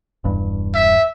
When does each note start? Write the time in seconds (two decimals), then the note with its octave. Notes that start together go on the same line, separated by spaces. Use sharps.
0.24 E1 G2
0.75 E5